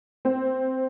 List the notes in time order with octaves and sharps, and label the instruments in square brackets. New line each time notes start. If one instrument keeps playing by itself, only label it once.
[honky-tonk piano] C4